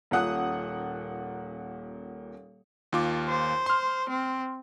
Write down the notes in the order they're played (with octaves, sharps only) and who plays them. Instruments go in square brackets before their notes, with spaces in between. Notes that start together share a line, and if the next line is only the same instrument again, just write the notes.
[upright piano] D#1 A#2 F#5 D#6 F#6
[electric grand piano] D#2 F4 D6
[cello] C5
[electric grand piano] C6 F6
[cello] C4